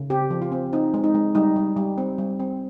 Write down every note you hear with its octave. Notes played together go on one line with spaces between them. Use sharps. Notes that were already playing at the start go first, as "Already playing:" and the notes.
Already playing: C#3
C4 G4
F3
F4
C4
C4 D#4
G#3
D#4
G#3
G3 D#4
G3
G3
C4
G3
C4